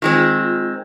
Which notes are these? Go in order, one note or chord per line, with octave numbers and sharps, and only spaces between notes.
D#3 G#3 C4 F4